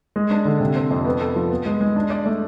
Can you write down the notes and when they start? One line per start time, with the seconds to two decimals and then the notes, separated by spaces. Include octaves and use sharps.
0.16 G#3
0.31 D4
0.45 D3
0.60 C3
0.76 C4
0.91 F2
1.05 B3
1.21 A4
1.36 F3
1.51 B3
1.66 G#3
1.81 G#3
1.96 D4
2.10 D5
2.26 A3